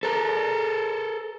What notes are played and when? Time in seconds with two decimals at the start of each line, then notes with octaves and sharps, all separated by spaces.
0.03 A4 A#4